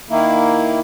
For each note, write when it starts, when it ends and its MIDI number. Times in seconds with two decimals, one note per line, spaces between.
0.10 0.80 51
0.10 0.80 58
0.10 0.80 64